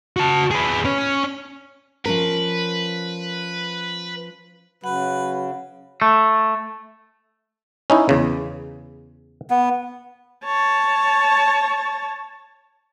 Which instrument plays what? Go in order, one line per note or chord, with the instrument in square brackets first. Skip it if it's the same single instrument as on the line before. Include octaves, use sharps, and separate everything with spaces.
[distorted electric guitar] F#4 A5
G#4 B4
C#4
[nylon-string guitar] F3 C#4 A#4 [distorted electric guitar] B4
[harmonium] C#3 [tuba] F#3 [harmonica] B4 [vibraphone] F#5
[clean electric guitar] A3
[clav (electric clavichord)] C#4 D#4 E4
E2 C#3
[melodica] B3
[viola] C#5 A5